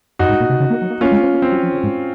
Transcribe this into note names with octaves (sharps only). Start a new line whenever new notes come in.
F#2 D#4 F#4
G#2
A#2
C3
C#3
A#3
F#3
A#3
A#3 C#4 F4
G#3
C4
A#3
C4
F#3
F3
C#3
G#2